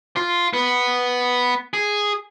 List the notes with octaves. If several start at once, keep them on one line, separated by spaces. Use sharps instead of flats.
F4
B3
G#4